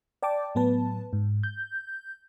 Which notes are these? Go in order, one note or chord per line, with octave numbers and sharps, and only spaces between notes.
D5 G5 A5 D6
A2 F#3 B3 B4 A5
G#2
G6